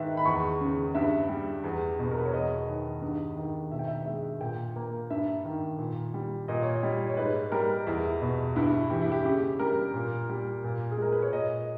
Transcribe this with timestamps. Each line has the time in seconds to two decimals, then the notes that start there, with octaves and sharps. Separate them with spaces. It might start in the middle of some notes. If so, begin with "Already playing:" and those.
Already playing: G#2 D#3 B4 E5
0.17 B5
0.26 E2 C#6
0.61 C#3
0.95 G2 E5
1.29 G3
1.64 E2
1.99 B2
2.11 A#4
2.18 B4
2.25 C#5
2.33 E2 D#5
2.67 D#3
3.02 G2
3.36 D#3
3.72 B2 E5
3.79 G5
3.88 E5
4.06 G#3 E5
4.41 A#2 G5
4.76 A#3
5.10 G2 E5
5.45 D#3
5.79 A#2
6.14 G3
6.48 A#2 D#5
6.63 C#5
6.76 D#5
6.83 G3
7.10 C#5
7.17 G#2 B4
7.52 G3 A#4
7.87 E2 E4
8.22 B2
8.56 G2 E4
8.90 E3 G4
9.02 E4
9.12 G4
9.25 C#3 G4
9.59 G3 A#4
9.94 A#2
10.29 G3
10.64 A#2
10.92 G#4
10.98 G#3 A#4
11.12 B4
11.22 C#5
11.32 A#2 D#5